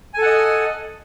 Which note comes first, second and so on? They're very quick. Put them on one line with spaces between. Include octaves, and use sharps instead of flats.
G#5 A4 F#5 D#5